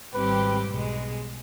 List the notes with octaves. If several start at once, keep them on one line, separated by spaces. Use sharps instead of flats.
G#1 G#2 G3 C4 G4 B4
B1 B2 G#3